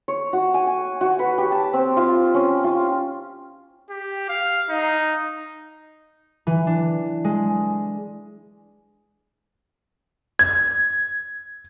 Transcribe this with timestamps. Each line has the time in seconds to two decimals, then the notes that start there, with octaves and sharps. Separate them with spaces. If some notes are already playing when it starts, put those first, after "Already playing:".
0.08 C#5
0.33 F#4
0.54 G#5
0.67 G#5
1.01 F#4
1.19 B4
1.38 G4
1.52 A5
1.73 C4
1.97 F4
2.34 C#4
2.64 F4
3.90 G4
4.29 F5
4.70 D#4
6.47 E3
6.67 D4
7.24 G#3
10.39 G#6